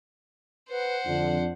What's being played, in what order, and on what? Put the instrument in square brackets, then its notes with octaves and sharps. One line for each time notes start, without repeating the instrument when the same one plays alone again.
[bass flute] B4 [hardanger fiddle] C5 F#5
[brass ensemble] F2 [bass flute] D3 [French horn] D4